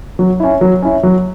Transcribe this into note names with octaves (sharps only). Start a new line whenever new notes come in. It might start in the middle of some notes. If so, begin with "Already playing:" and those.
F#3
C#4 E4
F#3
C#4 E4
F#3